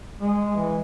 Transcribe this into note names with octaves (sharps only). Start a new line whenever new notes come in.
G#3
E3